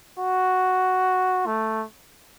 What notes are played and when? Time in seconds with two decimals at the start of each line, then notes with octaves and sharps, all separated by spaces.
0.18 F#4
1.46 A3